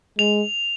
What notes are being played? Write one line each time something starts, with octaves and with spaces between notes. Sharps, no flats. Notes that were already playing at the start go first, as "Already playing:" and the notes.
G#3 F7